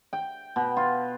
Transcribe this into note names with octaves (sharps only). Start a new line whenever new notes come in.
G5
B2
F4